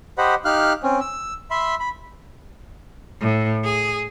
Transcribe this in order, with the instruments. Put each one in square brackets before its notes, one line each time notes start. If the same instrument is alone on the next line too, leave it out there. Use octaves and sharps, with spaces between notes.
[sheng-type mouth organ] G4 C5 D#5 F#5 B5
D#4 G4 F5 F6 F#6
C4 C#4
E6
E5 B5 C6
B5
[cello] A2
G#4